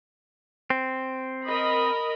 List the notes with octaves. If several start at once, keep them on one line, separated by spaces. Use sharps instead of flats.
C4
A#4 D#5 B5